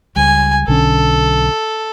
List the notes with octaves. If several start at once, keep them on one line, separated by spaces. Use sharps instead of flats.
C#2 G3 G#5
B1 D3 C#4 A4